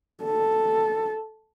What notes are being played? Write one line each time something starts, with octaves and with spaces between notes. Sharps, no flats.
A4